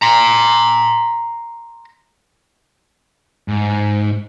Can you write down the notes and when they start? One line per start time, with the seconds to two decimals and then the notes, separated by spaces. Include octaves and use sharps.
0.02 A#5 C6
3.48 G#2